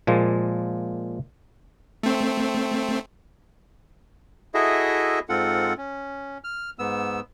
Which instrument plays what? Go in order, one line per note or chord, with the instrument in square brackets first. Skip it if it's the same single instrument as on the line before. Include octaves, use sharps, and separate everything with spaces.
[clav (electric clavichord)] A#2 F3 G#3 A#3
[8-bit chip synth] A3 C4
[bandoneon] E4 F#4 G#4 A4 D#5 E5
G#2 C4 F4 A4 F#5
C#4
F6
G#2 B3 E6